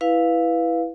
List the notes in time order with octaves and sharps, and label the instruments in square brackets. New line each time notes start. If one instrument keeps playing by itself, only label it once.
[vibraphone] E4 B4 F5